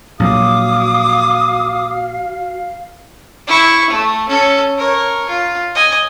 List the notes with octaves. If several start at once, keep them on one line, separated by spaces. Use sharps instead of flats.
A#1 F#3 F#4 F5 D6 D#6
E4 C#6
A3
C#4 A4
A#4 C#5
F4
D#5 G#5